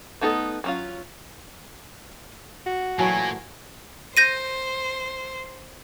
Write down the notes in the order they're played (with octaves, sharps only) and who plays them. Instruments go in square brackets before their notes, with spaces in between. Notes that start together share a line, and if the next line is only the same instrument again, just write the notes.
[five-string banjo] A3 B3 D#4 G#4 A4
F#3 C#4 F4
[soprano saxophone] F#4
[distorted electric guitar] A#2 A#3 [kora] E3 F#3 A3 [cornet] G#5
[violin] C5 [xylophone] G6 A#6 D#7